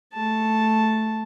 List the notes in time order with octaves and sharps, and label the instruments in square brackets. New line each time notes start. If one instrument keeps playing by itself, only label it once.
[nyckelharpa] A3 A5